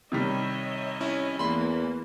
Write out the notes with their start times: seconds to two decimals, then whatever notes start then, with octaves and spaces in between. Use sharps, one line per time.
0.12 C3 D#3 G3 C#5 D#5 E5
1.01 C#4 E4
1.39 E2 E3 A#3 B5 C6